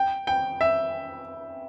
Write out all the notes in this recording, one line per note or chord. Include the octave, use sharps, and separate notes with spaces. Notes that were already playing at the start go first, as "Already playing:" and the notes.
Already playing: G5
G5
E5